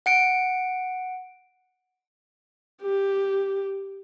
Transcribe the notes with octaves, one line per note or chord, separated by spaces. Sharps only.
F#5 C#7 D7
G4